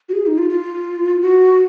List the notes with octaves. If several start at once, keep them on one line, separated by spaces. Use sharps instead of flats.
F#4
G#4
D#4
F4
F4
F#4